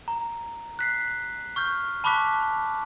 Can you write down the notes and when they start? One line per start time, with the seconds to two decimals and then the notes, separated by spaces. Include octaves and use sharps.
0.08 A#5
0.79 F#6 B6 C7
1.56 C#6 F6 G6
2.04 A5 B5 C#6 D6 F#6 B6